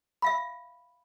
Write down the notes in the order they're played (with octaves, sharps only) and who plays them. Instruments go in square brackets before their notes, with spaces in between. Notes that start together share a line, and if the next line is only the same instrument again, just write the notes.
[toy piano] E5 F5 B5